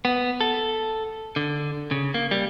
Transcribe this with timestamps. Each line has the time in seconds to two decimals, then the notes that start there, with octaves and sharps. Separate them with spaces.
0.05 B3
0.41 A4
1.36 D3
1.91 C#3
2.14 A#3
2.31 G3